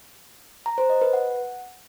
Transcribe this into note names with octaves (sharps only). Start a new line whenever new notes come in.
A#5
C5
D#5
B4
F#5